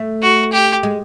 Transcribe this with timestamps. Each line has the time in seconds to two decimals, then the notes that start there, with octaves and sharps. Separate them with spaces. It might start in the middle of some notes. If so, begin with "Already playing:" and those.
Already playing: A3
0.22 F#4
0.52 G4
0.83 G#3